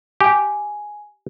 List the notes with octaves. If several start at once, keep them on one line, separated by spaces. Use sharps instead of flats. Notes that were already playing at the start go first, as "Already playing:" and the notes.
G4 G#5